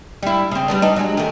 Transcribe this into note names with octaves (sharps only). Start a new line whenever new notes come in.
G3 E4
C#3 C4
G3 B3 D4
D4 D#4
F#3 G#3
D#3 A3